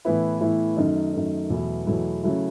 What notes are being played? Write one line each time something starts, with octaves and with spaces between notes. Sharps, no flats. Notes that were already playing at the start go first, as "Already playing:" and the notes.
A2 E3 B3 E4
A2 E3 B3 E4
F#2 D#3 A3 D#4
F#2 D#3 A3 D#4
E2 B2 F#3 A3 E4
E2 B2 F#3 A3 E4
C#3 F#3 A3 E4